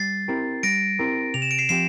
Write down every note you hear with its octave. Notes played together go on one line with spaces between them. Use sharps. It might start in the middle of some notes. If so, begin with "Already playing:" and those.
Already playing: G3 A6 C7
C4 E4 G4 A#4
G3 A#6 D7
C4 E4 G4 A#4
C3 F7
E7
D7
C7 E7
F3 C4 G4 C7 E7